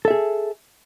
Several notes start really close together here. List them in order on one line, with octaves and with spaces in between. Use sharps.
A4 E5 G#4